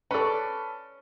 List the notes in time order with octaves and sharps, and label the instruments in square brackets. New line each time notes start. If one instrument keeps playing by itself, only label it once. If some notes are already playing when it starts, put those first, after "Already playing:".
[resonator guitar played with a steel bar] C#4 D5 [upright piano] A4 B4